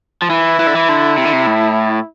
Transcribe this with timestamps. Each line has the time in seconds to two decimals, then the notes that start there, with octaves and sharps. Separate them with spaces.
0.22 F3
0.30 E3 E4
0.60 E3
0.67 D3
0.76 E3
0.89 D3
1.17 C3
1.25 D3
1.33 C3
1.47 A2